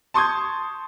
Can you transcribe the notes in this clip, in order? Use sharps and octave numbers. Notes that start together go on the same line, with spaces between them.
A5 C6 C#6 D#6 G6 G#6